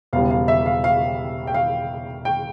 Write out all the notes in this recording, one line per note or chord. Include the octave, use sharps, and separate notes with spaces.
E1 E2 C#3 G3 F5
F5
E5
F5
F5
G5
F5
G5